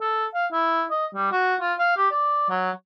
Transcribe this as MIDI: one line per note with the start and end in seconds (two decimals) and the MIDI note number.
0.01 0.26 69
0.34 0.46 77
0.52 0.84 64
0.91 1.06 75
1.14 1.29 55
1.32 1.56 66
1.61 1.74 65
1.79 1.96 77
1.97 2.08 67
2.11 2.49 74
2.49 2.71 54